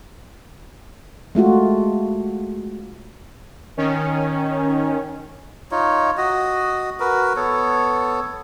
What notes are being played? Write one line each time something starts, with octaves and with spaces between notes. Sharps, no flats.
G#3 A3 F4 F#4
D#3 C#4
D#4 F4 C#5
F#4 D#5
F#4 A#4 B4
B3 A4 C#5